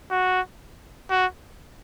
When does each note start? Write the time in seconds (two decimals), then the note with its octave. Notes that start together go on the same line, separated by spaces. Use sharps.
0.10 F#4
1.10 F#4